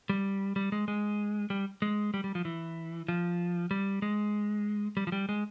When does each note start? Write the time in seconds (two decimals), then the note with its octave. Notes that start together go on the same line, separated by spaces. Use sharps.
0.09 G3
0.56 G3
0.72 G#3
0.88 G#3
1.50 G3
1.82 G#3
2.14 G3
2.24 G3
2.35 F3
2.45 E3
3.08 F3
3.71 G3
4.02 G#3
4.97 G3
5.07 F3
5.12 G3
5.29 G#3